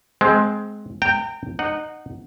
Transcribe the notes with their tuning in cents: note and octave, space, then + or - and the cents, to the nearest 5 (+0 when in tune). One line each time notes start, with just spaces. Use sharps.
G#3 +15 C4 +0
G5 +0 A#5 -30
D#4 -20 F#5 +0